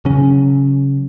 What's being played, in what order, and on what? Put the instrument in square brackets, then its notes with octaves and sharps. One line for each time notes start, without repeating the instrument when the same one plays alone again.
[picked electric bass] C#3 F#3 C#4